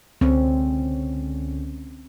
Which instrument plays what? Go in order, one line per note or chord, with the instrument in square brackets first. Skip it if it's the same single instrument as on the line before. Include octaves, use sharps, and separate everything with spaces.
[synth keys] C#2 D3 C#4 [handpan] C4